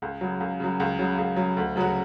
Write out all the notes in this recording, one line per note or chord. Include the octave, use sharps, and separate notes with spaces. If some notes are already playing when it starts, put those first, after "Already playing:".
C#2
C#3 F#3
C#2
C#3 F#3
C#2
C#3 F#3
C#2
C#3 F#3
D2
C#3 F#3 C#4 F#4